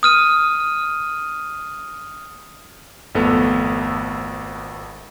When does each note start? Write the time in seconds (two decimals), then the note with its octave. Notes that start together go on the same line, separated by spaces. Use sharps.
0.03 D#6 F6 D#7
3.15 G#1 F2 A3 B3 A4